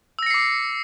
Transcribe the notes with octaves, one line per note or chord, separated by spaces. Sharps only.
D6 E6 A#6 C7 C#7